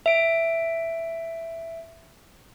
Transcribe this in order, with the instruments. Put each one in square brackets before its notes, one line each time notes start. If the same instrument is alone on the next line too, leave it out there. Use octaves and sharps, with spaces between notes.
[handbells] E5 D7